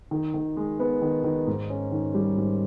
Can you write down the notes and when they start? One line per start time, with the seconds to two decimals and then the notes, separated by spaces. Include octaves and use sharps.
0.11 D#3
0.34 D#3
0.57 G#3
0.80 B3
1.02 D#3
1.24 D#3
1.47 G#2
1.70 C#4
1.92 D#3
2.14 G3
2.37 G#2